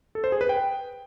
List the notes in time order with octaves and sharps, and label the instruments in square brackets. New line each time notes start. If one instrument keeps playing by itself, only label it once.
[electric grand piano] A4
C5
G#4
B4
G5